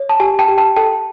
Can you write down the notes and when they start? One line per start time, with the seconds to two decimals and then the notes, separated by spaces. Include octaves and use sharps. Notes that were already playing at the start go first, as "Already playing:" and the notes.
Already playing: C#5
0.09 A5
0.20 G4 G#5
0.39 G5 A5
0.48 G4
0.58 G5 A5
0.76 A4 G5 A5